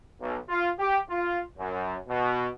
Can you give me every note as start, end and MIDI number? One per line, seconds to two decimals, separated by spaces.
0.20 0.38 35
0.49 0.69 65
0.79 0.97 67
1.09 1.40 65
1.58 1.96 42
2.08 2.48 47